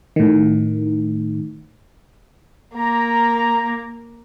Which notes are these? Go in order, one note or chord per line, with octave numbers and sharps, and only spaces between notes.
A2 D#3
A#3 A#5